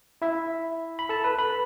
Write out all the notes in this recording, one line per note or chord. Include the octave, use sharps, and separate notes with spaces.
E4 E5
B5
A4 A5
B4 B5
B4 B5